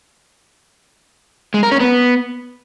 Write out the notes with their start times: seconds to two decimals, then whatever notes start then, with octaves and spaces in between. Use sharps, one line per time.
1.54 G#3
1.63 A#4
1.72 C#4
1.80 B3